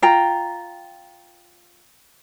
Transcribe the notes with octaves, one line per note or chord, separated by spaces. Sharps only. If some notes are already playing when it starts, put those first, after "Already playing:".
F4 G5 A#5